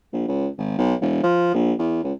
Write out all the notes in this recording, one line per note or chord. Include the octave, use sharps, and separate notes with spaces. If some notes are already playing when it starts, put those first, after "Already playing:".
A#1
C#2
G#1
B1
E1
F3
A#1
E2
C#2